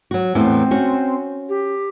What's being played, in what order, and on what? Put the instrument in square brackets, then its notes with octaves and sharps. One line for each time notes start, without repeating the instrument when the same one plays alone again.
[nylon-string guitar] F#3 F#4
[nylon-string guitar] E2 A2 E3 [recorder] C4
[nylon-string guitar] C#4 F#4
[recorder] G4